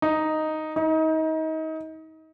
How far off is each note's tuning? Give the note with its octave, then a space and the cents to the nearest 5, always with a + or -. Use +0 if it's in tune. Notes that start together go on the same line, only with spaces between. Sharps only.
D#4 +0
D#4 +30